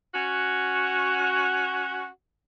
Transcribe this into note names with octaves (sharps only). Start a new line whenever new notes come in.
C#4 F#4